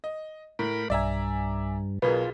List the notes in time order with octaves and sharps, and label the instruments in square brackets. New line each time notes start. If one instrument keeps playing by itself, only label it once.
[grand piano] D#5
[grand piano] A2 [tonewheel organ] A#4 B5
[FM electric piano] B1 G#5 [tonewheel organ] G2 [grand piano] D5 E5 A#5
[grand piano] B1 B2 G#4 [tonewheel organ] F4 [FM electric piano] A#4 B4